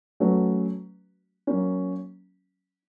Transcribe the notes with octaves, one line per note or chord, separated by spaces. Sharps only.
F#3 A3 C#4 F#4 B4
F#3 A#3 C#4